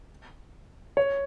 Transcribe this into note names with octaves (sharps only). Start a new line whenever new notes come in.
C#5